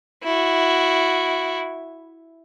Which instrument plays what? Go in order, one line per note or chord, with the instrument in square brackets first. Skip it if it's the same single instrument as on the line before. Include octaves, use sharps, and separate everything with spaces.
[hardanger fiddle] E4 F#4